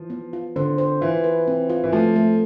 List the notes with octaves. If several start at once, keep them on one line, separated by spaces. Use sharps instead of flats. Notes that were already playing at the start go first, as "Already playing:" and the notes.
Already playing: E3 F3
B3
F4
D3 C5
C5
E3 F4
B4
C4
F4
E3
F3 A3
A3